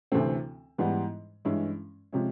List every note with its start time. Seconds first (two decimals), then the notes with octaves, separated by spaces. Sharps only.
0.12 D2 C3 E3 A3 C4
0.78 G#2 E3 G3 B3
1.45 G2 E3 G#3 C#4 E4
2.13 C3 F3 G#3 C#4